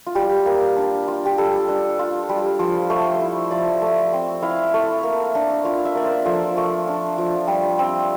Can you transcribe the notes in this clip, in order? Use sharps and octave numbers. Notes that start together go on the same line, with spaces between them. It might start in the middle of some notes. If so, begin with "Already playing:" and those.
F4
G3 G4
A#3
D4
F4
G4
G3 A4
D4
F4
G3
F3 C5
A3 C5
E4
F3 D5
A3
C4
E4 F5
A3
A#3
D4
F4 F5
E5
A#3 D5
C5
F3 A4
A3
D4
F3
G3 G4
C4